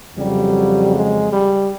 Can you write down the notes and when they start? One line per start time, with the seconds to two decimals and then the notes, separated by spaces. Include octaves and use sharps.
0.16 F2 C#3 F#3 G3
0.93 G#3
1.31 G3